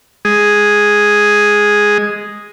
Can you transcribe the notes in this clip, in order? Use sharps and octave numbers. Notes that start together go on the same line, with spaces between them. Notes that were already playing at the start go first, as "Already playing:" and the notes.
G#3 G#4